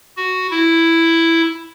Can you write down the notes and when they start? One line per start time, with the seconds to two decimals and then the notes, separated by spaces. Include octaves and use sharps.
0.17 F#4
0.51 E4